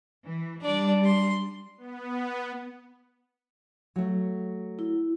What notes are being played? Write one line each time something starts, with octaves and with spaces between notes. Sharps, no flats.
E3
G3 D4 D5
C6
B3
F#3 A3
E4